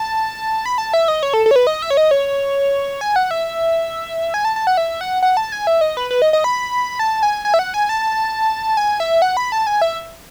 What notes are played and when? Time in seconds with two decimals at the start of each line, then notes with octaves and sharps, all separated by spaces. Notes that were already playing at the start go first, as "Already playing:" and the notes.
Already playing: A5
0.66 B5
0.78 A5
0.94 E5
1.08 D#5
1.23 C#5
1.33 A4
1.46 A4
1.51 C#5
1.56 B4
1.67 D#5
1.82 E5
1.90 C#5
1.97 D#5
2.11 C#5
3.01 G#5
3.16 F#5
3.31 E5
4.34 G#5
4.45 A5
4.56 A5
4.67 F#5
4.77 E5
5.01 F#5
5.22 F#5
5.37 A5
5.52 G#5
5.67 E5
5.81 D#5
5.97 B4
6.11 B4
6.22 D#5
6.33 D#5
6.44 B5
6.99 A5
7.23 G#5
7.45 G#5
7.54 E5
7.59 F#5
7.74 G#5
7.89 A5
8.77 G#5
9.00 E5
9.22 F#5
9.37 B5
9.52 A5
9.67 G#5
9.81 E5